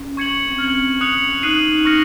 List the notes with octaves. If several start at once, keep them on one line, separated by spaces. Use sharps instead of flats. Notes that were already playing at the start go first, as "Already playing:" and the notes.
Already playing: C#4
C#6 G#6 C#7 F#7
C4
C#4 F6 G#6 C#7 F#7
D#6 F#6 C#7 F7
D#4 D#6 F#6 C7 D#7 F#7
C#6 F6 A#6 C#7